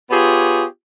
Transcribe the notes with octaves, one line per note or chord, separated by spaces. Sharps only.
B3 F4 G4 G#4 C#5